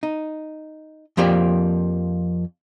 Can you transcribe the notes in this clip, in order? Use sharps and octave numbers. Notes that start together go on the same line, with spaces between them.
D#4
F2 F3 A#3 G4 D5